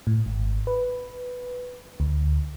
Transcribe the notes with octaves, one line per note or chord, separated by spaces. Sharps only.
A2
G#1
B4
D2